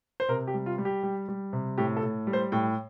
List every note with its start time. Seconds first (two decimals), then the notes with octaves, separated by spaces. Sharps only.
0.20 C5
0.29 C3 A#4
0.47 G4
0.54 G3
0.66 F4
0.78 G3
0.85 G4
1.03 G3
1.28 G3
1.53 C3
1.78 A2 G4
1.97 A4
2.03 A2
2.27 G3
2.33 C5
2.52 A2 G5